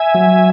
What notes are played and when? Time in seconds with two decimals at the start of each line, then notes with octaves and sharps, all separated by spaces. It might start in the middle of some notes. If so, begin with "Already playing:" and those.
Already playing: E5 G#5
0.15 F#3